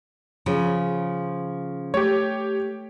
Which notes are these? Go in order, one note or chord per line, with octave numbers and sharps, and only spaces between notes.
C#3 F3
A3 G4 C#5